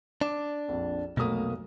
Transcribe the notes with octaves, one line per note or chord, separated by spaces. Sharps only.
D4 D6 E7
A#1 F2
F1 B1 B2 A3 A#3 D#6